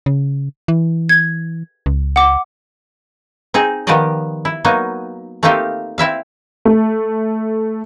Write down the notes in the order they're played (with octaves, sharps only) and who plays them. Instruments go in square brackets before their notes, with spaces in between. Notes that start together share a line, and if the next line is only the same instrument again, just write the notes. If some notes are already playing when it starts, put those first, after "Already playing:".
[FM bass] C#3
E3
[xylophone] G#6
[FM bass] C#2
[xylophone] F#5 D6
[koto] C4 D#4 G#4
D#3 F3 B3 G4 D5 D#5
E4
F#3 A#3 B3 D#4
A3 A#3 C4 D#4 F4 G4
C4 E4 E5 F5
[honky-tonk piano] A3